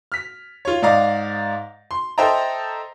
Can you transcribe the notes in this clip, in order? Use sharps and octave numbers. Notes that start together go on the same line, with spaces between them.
F6 B6
F4 C#5
G#2 D5 D#5 F5 A#5
C6
A4 C5 D#5 E5 G5 A#5